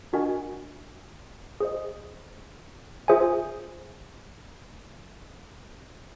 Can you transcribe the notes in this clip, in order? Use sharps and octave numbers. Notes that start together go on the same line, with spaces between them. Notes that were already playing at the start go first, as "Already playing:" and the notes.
D4 F#4 A#4 D#5 G#5
G#4 C5 D#5
F4 G#4 C5 E5 G#5